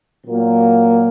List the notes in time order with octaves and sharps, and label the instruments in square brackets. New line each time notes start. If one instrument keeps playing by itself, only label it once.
[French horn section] A#2 F#3 A#3